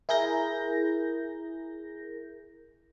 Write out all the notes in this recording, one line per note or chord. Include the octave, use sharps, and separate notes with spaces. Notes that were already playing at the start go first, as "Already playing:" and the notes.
E4 G#4 A#4 G6 A#6